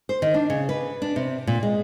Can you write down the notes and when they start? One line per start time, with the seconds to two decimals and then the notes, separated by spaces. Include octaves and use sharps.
0.09 C5
0.22 D#3
0.34 D4
0.50 C#3
0.69 B4
1.02 D4
1.16 C3
1.47 A#2
1.63 G#3